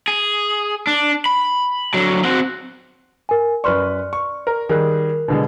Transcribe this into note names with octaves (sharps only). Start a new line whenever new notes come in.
G#4
D4
B5
D3 F#3
C4 F#4
A#4 G#5
F#2 B4 D5 C6 C#6 F6
C#6
A#4
D#3 G3 G#4 A#4 F#6
B2 D3 G#3